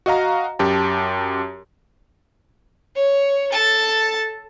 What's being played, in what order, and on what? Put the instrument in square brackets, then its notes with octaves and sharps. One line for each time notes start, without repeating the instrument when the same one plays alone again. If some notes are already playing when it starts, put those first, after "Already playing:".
[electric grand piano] F#4 D#5 F5 A#5
F#2 G4 A5
[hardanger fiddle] C#5
A4 A5